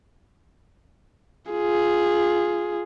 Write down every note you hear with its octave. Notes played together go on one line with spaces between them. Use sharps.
F4 G#4